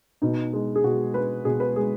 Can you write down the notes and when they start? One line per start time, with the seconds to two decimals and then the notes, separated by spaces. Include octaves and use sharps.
0.22 B2 D#4
0.53 G#3
0.76 G#4
0.83 B2 F#4
1.14 G#3 B4
1.45 B2 G#4
1.60 B4
1.76 G#3 G#4